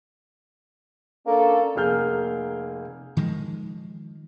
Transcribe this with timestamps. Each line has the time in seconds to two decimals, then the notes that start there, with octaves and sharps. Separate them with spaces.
1.27 A#3 C#4 D4 A4
1.76 F1 A#3 G#4 F6 G6
3.17 D#3 F3 G#3